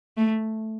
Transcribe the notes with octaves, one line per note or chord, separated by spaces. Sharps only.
A3